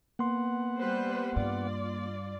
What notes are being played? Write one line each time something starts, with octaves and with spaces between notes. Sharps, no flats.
A#3 B3 F#5 C6
G3 B4 C5
G2 F4 D5